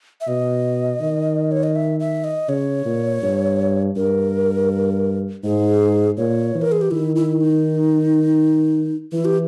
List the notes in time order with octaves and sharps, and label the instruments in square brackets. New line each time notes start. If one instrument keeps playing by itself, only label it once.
[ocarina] E5
[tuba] B2 [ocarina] D#5
[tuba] D#3
[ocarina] C#5
D#5
E5
E5
D#5
[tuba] C#3 [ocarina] C#5
[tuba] A#2
G2
[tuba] G2 [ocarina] A#4
[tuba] G#2 [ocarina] G#4
[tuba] A#2 [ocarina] C#5
[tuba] E3
[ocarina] A#4
G#4
G4
[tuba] D#3 [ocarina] E4
[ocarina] E4
D#4
[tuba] E3 [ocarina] E4
[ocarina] G4